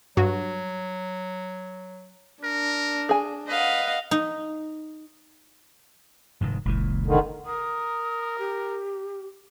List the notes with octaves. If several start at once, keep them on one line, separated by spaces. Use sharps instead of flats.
G2 F#3 F#4
D4 A#4
G#4 G#5
B4 D#5 F5 F#5
D#4
F1 G#2 D#3
F#1 C#2 A#2 E3
D3 D#3
A#4 D#6
G4